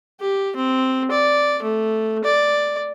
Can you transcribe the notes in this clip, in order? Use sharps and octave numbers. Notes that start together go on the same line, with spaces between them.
G4
C4
D5
A3
D5